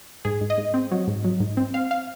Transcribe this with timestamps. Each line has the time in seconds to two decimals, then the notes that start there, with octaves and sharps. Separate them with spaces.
0.25 G#2 G#4
0.41 G#2
0.50 D#5
0.58 G#2
0.74 C4
0.91 F#3
1.08 G#2
1.24 F#3
1.40 G#2
1.57 C4
1.74 C4 F5
1.91 F5